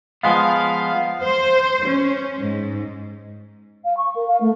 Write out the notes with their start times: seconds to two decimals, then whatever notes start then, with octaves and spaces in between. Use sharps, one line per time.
0.23 F3 G#3 B3 F5
1.25 C5
1.87 C#4
2.37 G#2
3.84 F5
3.97 C#6
4.15 A#4
4.27 F5
4.40 A3